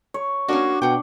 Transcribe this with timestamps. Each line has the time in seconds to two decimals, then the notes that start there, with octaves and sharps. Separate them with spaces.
0.14 C#5
0.48 A#3 C#4 D4 F#4
0.82 B2 F#5 G5